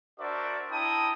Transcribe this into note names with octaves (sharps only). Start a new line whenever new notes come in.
D4 F#4 A#4 C5 D5 E5
D4 E4 G5 A5 A#5 D#6